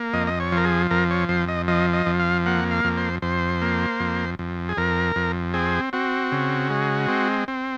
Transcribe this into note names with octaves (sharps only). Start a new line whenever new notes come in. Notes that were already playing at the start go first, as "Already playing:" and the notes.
Already playing: A#3
F2 D#5
D#5
C#5
F3 A#4
G#4
F2 A#4
C#5
F2 C5
D#5
F3 D#5
D#5
F2
F5
A#3 F#5
F5
F2
C5
F2 C5
A#3
F2
F2
G#4
F2 A#4
F2
C4 G#4
C4 F#4
C#3
G#3
C4
C4